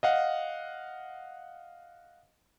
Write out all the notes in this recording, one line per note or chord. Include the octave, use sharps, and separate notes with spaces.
D#5 F5 F#5